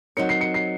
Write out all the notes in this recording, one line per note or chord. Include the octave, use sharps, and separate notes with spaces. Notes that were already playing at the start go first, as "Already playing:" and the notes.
F#3 C4 D#4 A#4 C#5 C#7
C7
C#7
C7